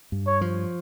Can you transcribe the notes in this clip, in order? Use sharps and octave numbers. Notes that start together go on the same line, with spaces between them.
G2
C#5
F3